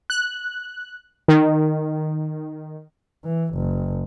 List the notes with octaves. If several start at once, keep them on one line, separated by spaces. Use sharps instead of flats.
F#6
D#3
E3
F#1